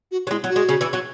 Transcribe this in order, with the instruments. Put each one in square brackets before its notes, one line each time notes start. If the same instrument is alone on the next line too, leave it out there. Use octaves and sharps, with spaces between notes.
[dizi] F#4
[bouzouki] F#3
[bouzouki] G#3 [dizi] E4
[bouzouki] F#3
[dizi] F#4
[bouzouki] G#3
C#3 C#4
E3 E4
F#3 F#4